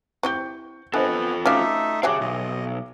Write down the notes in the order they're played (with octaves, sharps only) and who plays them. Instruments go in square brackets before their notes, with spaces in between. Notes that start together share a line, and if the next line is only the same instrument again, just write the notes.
[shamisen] C4 E4 G4 [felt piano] C#6 G6
[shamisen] D3 [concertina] B3 [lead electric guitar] F4 A4 [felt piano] C5 D#5 G#5
[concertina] A3 D#4 E5 [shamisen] C#4 F#4 F5 [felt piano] D6
[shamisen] F#3 G4 C#5 [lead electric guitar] G#4 F5 [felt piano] E5 G#5 D6
[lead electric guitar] B1 [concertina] D#5